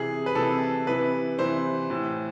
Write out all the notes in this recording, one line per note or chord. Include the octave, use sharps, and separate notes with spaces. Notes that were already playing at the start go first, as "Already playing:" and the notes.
Already playing: C3 E3 G#4
B4
C3 E3 A4
C3 E3 B4
C3 E3 C5
A2 E3